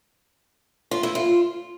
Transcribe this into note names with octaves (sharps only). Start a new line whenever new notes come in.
F4
E4
F4